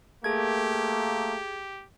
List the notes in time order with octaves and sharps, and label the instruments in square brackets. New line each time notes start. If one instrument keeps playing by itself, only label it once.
[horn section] A3 A#3 [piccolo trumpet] G4 [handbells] G#4 G#6